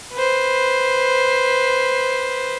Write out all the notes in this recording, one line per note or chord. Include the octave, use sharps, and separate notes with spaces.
B4 C5